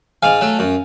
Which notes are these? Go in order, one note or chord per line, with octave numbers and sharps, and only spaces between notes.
G#2 F5 G#5
F#3 A3
F#2